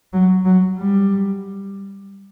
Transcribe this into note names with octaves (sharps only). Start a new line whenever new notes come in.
F#3
F#3
G3